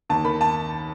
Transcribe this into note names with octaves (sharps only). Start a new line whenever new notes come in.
D#2 A5
D#3 B5
A5